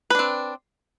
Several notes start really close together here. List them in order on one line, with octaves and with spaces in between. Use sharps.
B4 D4 C4